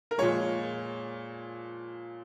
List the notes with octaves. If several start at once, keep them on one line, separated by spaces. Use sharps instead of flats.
A#4
A#2 F3 G#3 C#5